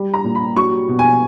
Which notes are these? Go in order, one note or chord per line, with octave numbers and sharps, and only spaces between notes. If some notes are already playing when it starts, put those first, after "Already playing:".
Already playing: G3
A#5
A#2
B5
F#3 C#6
B2
G#5